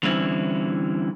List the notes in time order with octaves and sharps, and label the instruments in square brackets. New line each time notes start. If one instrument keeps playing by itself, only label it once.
[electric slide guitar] D3 E3 G3 C4 C#4 E4